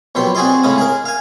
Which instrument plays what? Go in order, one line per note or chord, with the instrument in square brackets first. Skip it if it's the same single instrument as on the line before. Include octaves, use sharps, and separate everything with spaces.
[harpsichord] A#1 B2 F#3 G4 C6
C4 F#4 G#4 D5 D#5 C6
A2 C#3 G#3 C#4 D#6
G#4 A#4
F5 G#5